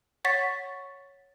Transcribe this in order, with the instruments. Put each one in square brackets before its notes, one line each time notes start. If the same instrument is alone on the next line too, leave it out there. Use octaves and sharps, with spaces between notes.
[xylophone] C#5 F#5 C#6 A6 B6